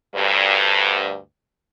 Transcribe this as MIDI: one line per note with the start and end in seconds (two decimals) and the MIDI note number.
0.15 1.18 38
0.15 1.18 43